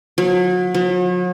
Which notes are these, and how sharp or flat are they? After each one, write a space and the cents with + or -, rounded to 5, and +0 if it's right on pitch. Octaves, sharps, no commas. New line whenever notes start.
F#3 -35
F#3 -45